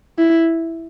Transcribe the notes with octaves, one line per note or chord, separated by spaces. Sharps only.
E4